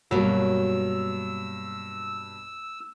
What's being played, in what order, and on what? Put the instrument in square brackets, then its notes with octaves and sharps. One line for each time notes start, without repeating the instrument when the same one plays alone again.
[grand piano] G2 B2 [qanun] F#3 A#3 [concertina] E6